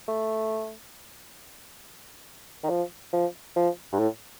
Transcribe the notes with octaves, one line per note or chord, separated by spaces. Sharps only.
A3
D#3
F3
F3
F3
G2
A2